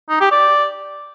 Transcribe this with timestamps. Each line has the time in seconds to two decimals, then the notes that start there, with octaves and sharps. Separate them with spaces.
0.10 D#4
0.21 G4
0.32 D5